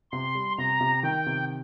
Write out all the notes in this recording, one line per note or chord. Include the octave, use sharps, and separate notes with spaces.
C3 C6
G3
C3 A#5
C3
D#3 G5
C3